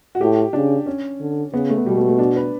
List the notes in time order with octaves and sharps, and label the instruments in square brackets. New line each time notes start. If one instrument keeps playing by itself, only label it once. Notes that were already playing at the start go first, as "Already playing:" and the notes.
[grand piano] F#4
[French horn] A2 [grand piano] G4
[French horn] C#3 [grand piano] D4
[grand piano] C#4
[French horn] D3
[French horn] C#3 [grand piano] B3
[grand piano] A3
B3
[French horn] B2 [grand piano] G3
[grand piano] A3
A3
D4
B4